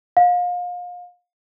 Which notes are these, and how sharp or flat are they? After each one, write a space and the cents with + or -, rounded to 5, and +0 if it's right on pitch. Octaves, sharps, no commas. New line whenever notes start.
F5 +35